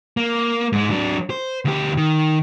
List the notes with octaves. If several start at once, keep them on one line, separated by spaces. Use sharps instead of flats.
A#3
G#2 G#3
F#3 D4
C5
D2 G4
D#3